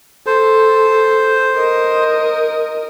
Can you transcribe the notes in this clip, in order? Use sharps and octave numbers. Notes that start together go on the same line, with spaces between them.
A4 C5
A#4 D#5